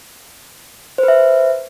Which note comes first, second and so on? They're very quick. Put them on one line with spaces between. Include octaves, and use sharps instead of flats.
C5 B4 E5